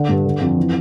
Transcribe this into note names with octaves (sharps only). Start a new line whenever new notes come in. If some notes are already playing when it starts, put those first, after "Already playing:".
Already playing: D3
G2
D3
F2
E3